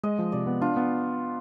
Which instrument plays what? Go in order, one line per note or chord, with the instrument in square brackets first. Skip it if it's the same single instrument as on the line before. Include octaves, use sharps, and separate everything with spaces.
[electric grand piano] G#3 [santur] D#5
[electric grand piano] F3
[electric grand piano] C3 [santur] D5
[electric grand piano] B3
[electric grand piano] D4 [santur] F4
[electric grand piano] B3